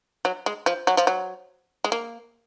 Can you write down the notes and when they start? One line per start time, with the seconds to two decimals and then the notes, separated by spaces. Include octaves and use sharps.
0.25 F#3
0.46 G#3
0.66 F3
0.87 F#3
0.97 F3
1.07 F#3
1.84 G#3
1.92 A#3